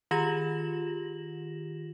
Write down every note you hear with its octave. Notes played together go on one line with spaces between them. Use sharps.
D#3 F4 G4 A#6 E7 F#7